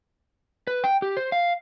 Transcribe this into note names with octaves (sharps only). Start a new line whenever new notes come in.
B4
G5
G4
C5
F5